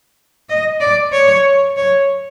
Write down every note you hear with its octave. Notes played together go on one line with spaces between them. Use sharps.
D#5
D5
C#5
C#5